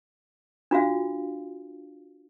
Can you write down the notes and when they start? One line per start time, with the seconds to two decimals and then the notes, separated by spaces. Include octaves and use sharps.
0.71 D4 F4 F#4 F5